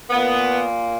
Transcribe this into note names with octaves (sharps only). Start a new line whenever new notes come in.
A#2 A#3 B3